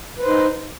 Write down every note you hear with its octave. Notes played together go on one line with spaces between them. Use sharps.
D#4 B4 C5